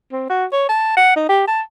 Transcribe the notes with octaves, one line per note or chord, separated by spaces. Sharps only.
C4
F#4
C#5
A5
F#5
D#4
G4
A5